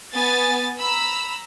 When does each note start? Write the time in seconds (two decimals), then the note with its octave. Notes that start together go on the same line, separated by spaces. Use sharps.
0.14 B3 G#5 A6
0.80 A#5 B5 E6